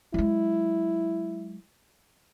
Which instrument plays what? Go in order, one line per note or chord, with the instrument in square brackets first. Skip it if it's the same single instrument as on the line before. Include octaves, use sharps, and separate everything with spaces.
[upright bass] F#3 G#3 [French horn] E4